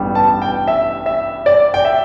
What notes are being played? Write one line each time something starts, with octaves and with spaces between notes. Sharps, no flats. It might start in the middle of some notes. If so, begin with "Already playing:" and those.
Already playing: A1 G2 G3 B3
A5
G5
E5
E5
D5
G5
E5